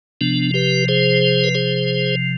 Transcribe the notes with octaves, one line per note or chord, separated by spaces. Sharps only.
C3 F3 B3 D4
G4 B4
G#4 C5
B4
G#4 C5